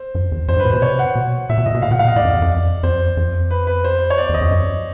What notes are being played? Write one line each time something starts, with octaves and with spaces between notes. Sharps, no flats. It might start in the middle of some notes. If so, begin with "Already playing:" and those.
Already playing: C5
F#2
E2
F2 C5
G2
B4
A#2
B2 C5
C3 C#5
F#5
B2
A#2 E5
B2
A#2 D#5
B2
A#2 F5
B2 F#5
A#2 F5
D#5
A2 D5
F2
E2
F2
F2 C5
F2
B4
B4
C5
C#5
D5
E2 D#5
F2
F#2